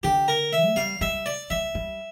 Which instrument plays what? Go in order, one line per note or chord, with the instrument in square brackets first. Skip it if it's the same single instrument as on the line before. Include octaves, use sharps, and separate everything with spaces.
[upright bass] D3 [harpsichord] G4
[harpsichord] A#4
E5
[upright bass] A3
[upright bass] G3 [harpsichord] F5
[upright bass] G3 [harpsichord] E5
[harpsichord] D5
[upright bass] G3 [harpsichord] E5
[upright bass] G3